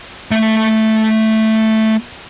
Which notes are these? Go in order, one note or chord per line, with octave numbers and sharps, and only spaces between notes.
A3 E5